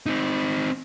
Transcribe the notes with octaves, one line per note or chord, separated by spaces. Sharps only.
C4 D#4